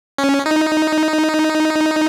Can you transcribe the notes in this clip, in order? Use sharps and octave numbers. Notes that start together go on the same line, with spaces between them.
C#4
D#4